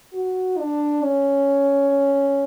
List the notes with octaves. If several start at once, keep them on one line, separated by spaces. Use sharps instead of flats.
F#4
D4
C#4